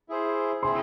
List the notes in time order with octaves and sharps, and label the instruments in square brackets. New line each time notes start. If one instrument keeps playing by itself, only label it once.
[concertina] E4 G#4 C5
[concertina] C4 E4 G#4 C5 [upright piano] C6